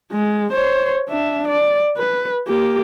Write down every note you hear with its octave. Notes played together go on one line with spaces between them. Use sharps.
G#3
C5 C#5
D4 E5
D5
B4
A#3 G4